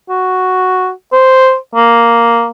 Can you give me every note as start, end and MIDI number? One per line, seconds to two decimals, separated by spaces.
0.09 0.91 66
1.12 1.56 72
1.75 2.49 58